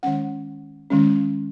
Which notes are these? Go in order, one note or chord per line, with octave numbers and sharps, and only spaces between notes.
D#3 G#3 C#4 F#5
D#3 G#3 C#4